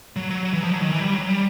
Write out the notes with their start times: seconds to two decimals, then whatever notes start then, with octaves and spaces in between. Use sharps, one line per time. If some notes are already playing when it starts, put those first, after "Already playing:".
0.16 F#3
0.31 F#3
0.45 F#3
0.53 E3
0.64 F3
0.73 F#3
0.82 D#3
0.92 E3
1.01 G3
1.14 F#3
1.30 G3